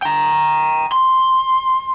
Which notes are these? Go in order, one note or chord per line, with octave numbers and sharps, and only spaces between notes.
G5 A#5
C6